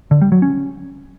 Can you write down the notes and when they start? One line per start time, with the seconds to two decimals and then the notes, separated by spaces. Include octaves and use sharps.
0.11 D3
0.21 G3
0.32 F#3
0.42 C#4